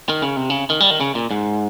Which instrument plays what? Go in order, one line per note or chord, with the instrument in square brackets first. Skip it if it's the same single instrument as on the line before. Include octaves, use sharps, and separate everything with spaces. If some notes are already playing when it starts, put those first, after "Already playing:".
[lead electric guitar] D#3
C#3
C3
C#3
D#3
G3
D#3
C#3
A#2
G#2